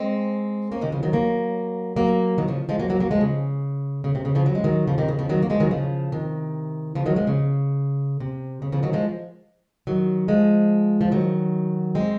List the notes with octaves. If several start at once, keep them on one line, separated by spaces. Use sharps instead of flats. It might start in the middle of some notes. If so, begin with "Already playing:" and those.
Already playing: G#3 C4
A#3 C#4
C3 D#3
C#3 F3
D#3 F#3
F#3 A#3
F#3 A#3
D#3 F#3
C#3 F3
F3 G#3
F#3 A#3
F#3 A#3
F#3 A#3
F3 G#3
C#3
C#3
C3
C#3
C#3 F3
F#3
G#3
D#3 F#3
C#3 F3
C3 D#3
C#3
C#3 F3
D#3 F#3
A#3
F3 G#3
D#3 F#3
C#3 F3
C3 D#3
C#3 F3
D#3 F#3
F3 G#3
C#3
C3
C#3
C#3 F3
D#3 F#3
F3 G#3
D#3 F#3
F3 G#3
F3
D#3 F#3
G#3 C4